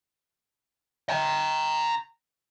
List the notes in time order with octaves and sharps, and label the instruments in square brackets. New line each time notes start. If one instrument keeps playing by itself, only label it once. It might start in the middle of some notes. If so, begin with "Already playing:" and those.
[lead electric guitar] G5 A#5